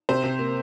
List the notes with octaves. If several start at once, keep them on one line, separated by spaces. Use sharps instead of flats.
C3 C5
C3
A#3